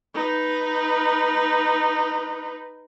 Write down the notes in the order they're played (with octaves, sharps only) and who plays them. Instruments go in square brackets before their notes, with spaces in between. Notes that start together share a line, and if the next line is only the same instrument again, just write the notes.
[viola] D#4 B4